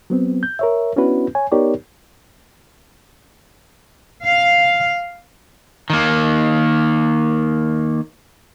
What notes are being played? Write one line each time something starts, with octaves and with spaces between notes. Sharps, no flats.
F#3 B3 C4
G6
A#4 C#5 E5
B3 C#4 D4 E4 F#4 B4
C#5 G#5
B3 D#4 G4 A#4 C#5 D5
F5
D#3 A#3